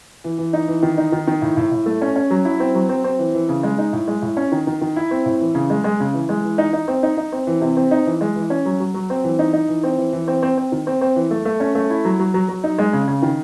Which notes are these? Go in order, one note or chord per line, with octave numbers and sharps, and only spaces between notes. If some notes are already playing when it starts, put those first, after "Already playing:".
E3
E3
D#4
E3
D#3
D#4
D#3
D#3
A2
A2
A2
A3
C#4
C#4
F#3
E4
C4
F#3
C4
C4
E3
E3
C#3
G#3
D#4
A2
G#3
A2
C#4
D#3
D#3
D#3
E4
C4
A2
E3
C#3
G#3
G#3
C#3
E3
G#3
E3
D#4
D#4
C4
D#4
D#4
C4
E3
C3
C4
D#4
E3
G#3
E3
C#4
F#3
F#3
F#3
C4
E3
D#4
D#4
E3
C4
E3
E3
C4
C4
C4
D#3
C4
C4
E3
A3
A3
C#4
A3
E4
F#3
F#3
F#3
F#3
D#4
G#3
C#3
C#3
D#3